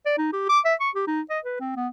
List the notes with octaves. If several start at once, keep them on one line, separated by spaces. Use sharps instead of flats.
D5
D#4
G4
D6
E5
C#6
G4
D#4
D#5
B4
C4
B3